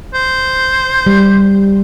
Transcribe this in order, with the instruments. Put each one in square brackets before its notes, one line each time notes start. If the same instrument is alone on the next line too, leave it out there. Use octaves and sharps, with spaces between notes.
[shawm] C5
[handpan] G3